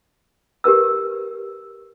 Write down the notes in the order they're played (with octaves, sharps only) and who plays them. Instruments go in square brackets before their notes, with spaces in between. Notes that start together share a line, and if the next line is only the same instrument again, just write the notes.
[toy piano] G4 A#4 B4 E6